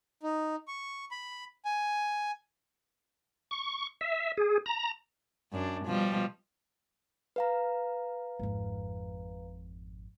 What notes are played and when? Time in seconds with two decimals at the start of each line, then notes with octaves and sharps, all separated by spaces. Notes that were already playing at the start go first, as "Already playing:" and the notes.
0.23 D#4
0.68 C#6
1.11 B5
1.65 G#5
3.51 C#6
4.01 E5
4.37 G#4
4.66 A#5
5.52 F#2 D4
5.86 B2 F3 G3
7.36 B4 F5 A#5
8.39 G#1 F2